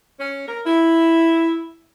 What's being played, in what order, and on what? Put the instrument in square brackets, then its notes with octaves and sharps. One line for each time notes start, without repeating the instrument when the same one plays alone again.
[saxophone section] C#4
A#4
E4